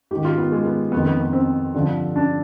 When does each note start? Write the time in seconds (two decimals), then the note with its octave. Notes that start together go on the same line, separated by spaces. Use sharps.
0.11 G#2 D#3 G4
0.25 F4
0.38 B3
0.52 G#3
0.65 B3
0.92 F2 D#3 B3
1.06 B3
1.20 B3
1.33 C4
1.74 G2 D3 F3
2.16 D4